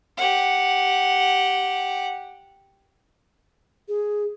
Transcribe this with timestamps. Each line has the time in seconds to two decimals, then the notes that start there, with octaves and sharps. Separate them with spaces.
0.17 G4 F#5
3.88 G#4